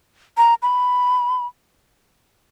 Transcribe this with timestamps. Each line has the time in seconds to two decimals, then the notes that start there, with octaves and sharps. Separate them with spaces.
0.37 A#5
0.62 B5